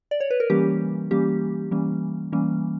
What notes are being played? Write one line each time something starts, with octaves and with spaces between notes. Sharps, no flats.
D5
C#5
B4
A#4
E3 G3 A#3 C#4 G4
E3 G3 A#3 C#4 G4
E3 G3 A#3 C#4
E3 G3 A#3 C#4